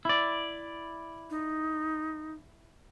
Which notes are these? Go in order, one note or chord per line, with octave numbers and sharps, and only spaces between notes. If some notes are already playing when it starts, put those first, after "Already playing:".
E4 D5
D#4